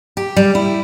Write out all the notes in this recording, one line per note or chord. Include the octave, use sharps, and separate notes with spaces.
G4
G3
E4